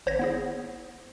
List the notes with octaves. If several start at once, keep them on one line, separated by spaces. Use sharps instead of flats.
G#1 C5 C#5 G#6 A#6
B3 E4 G#4